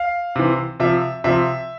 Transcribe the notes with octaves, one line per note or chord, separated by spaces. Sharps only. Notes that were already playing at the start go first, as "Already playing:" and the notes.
Already playing: F5
C3 E3
C3 F3 E5
C3 F3 E5